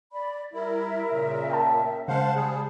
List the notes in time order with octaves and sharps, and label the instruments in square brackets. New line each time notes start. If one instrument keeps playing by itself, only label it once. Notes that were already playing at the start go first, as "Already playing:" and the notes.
[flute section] D5 B5
[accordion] G3 E4 [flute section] A#4 E5
[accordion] A#2 C#3
[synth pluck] G5 A5
[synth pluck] C#3 G#3 [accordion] C5 F5 F#5 [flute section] A5
[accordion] G3 G#4